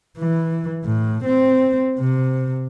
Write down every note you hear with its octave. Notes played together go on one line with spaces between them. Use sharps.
E3
A2
C4
C3